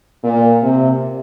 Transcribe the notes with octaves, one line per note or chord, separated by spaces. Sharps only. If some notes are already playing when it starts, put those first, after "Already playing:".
A#2
C3